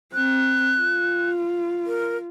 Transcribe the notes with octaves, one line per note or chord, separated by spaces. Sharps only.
C4 F#6
F4
A#4